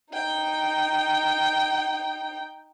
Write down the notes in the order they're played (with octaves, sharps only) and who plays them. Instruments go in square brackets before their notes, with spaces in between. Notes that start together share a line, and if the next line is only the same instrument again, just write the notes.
[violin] D#4 G5